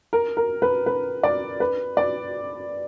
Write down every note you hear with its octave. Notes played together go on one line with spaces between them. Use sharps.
A#4
A#4
B4
B4
D5
B4
D5